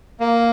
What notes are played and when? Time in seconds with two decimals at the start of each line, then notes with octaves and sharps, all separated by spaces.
0.20 A#3